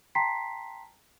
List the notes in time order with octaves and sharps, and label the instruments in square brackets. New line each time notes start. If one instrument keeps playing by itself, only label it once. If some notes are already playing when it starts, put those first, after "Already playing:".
[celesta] G5 A5 A#5 C6 B6 C7